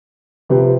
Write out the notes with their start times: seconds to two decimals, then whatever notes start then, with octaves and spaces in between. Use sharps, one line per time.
0.49 C3 F3 C4 G4 B4